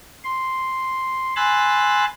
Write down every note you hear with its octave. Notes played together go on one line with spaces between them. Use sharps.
C6
G#5 B5 C6 E6 F#6 A6